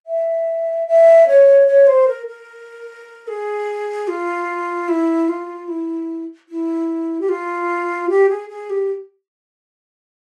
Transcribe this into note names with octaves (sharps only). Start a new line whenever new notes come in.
E5
E5
C#5
C#5
C5
A#4
A#4
G#4
F4
E4
F4
E4
E4
G4
F4
G4
G#4
G#4
G4